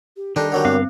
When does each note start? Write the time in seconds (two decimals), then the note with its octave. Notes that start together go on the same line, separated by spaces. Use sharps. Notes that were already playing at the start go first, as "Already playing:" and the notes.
0.17 G4
0.36 D#3 G3 D4 D#4 A4
0.52 D3 F#3 G3 A#4
0.65 G2 B3 C4 F5